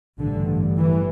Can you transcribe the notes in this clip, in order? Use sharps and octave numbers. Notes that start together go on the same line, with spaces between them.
A1 G2 D3
E3